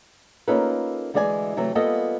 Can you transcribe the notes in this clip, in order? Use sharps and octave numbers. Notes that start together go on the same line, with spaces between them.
A#3 C#4 D#4 F4 A4 B4
D2 E3 G#3 D5 E5 G#5
C3 E3 F#3 A3 A4
G3 A#3 B3 F4 A4 D#5